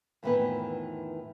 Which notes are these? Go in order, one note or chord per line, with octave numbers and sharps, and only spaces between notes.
F2 A2 D#3 E3 B3 B4